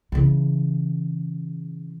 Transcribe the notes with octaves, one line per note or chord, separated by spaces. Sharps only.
C#3 E3